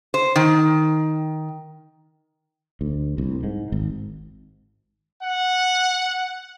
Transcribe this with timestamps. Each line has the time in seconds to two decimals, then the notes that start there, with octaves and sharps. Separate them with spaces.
0.14 C5
0.36 D#3
2.81 D2
3.18 C2
3.44 G#2
3.72 G#1
5.20 F#5